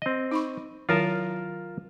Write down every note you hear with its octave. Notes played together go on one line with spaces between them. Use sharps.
C4 D#5
D#4 B5 C#6
D#3 F#3 E4 F4 A#4 A5